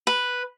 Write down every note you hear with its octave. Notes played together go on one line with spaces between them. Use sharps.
B4